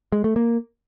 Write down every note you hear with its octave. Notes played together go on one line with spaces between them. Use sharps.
G#3
A3
A#3